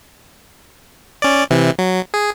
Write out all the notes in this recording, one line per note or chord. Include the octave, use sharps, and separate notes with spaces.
C#4 D5
C3 E3
F#3
G#4